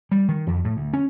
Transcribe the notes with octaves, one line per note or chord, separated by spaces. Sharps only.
G3
D#3
F2
A2
D2
C#4